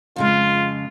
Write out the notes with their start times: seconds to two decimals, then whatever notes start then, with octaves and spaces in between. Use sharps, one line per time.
0.16 F2 C#3 G#3 F4